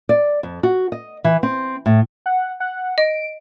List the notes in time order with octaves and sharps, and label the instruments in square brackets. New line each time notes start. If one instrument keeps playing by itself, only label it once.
[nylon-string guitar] D5
F2
F#4
D#5
E3
C4
A2
[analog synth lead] F#5
F#5
[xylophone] D#5 [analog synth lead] D7